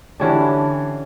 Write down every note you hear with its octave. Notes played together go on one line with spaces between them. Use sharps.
D3 E3 C#4 D4 G4